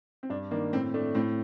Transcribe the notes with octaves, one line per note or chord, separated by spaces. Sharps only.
C4
G2 D4
D#3 A#3 D4
A2 C4
A3 D4
A2 C4